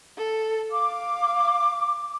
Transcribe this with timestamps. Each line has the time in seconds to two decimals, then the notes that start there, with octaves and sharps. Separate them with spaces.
0.17 A4
0.72 F5 D6